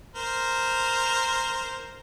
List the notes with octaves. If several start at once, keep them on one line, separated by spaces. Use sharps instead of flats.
A#4 C5